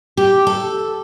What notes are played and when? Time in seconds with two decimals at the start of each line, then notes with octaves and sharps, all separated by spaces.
0.17 G4
0.47 A4